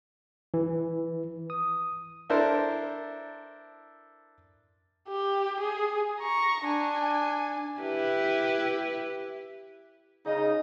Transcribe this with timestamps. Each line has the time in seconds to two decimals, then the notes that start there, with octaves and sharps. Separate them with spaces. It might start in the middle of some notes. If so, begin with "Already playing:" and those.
0.54 E3
1.50 D#6
2.30 D4 E4 A4 A#4 C5
5.09 G4
5.60 G#4
6.20 A#5 C#6
6.65 D4 G#5
7.81 E4 G4 B4
10.26 C#3 D#4 D#5